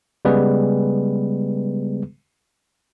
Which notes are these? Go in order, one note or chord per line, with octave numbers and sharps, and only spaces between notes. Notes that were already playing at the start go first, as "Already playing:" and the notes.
C#3 G3 G#3 B3 G#4 B4